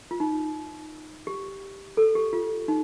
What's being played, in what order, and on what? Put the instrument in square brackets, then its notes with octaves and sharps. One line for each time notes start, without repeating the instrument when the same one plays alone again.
[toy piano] F4
D#4
G4
A4
G4
F4
D#4